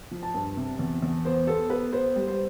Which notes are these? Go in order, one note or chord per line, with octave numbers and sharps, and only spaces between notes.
F3
A5
G2
C3
E2
E2
B3 C5
B3 A4
B3 B4
B3 C5
G3
C5